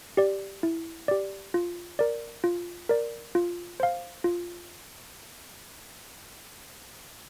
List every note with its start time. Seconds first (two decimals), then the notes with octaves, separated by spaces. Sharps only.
0.17 G4 D5
0.63 E4
1.08 G4 D5
1.54 F4
1.99 A#4 D5
2.44 F4
2.89 A#4 D5
3.35 F4
3.80 C5 F5
4.24 F4